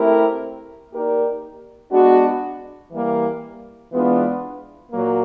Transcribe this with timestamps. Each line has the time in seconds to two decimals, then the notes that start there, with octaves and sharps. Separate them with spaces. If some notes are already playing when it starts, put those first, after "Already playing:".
Already playing: A3 C4 E4 G4 A#4
0.91 A#3 D#4 G4 A#4 D5
1.92 G#3 B3 D4 F#4
2.92 E3 G3 A#3
3.91 E3 G#3 B3 D4 F4
4.91 A#2 F#3 A#3